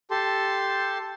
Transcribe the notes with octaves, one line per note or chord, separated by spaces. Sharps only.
G4 A4 A5 C6